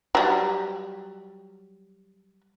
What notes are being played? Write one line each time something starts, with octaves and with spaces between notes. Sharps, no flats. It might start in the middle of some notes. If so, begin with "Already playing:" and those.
F#3 G3